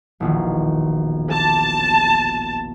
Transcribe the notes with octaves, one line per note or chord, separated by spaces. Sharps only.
E1 A#1 D#3
A5 D6